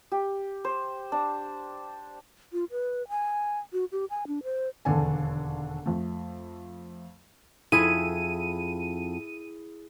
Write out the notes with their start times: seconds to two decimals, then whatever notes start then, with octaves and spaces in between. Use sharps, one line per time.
0.12 G4
0.65 C5
1.12 D4
2.53 F4
2.71 B4
3.09 G#5
3.73 F#4
3.92 G4
4.10 G#5
4.27 D4
4.43 C5
4.85 E1 D#2 D3 D4 A4 G#5
5.86 F2 A3
7.72 F2 E4 G#4 D#7